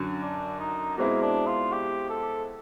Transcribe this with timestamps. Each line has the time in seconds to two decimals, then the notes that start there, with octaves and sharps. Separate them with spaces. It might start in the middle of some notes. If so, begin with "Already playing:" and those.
Already playing: F#2 D3 F#3
0.22 D4
0.60 D#4
0.97 B2 G#3 A#3 C4 E4
1.22 D4
1.47 F4
1.72 G4
2.10 A4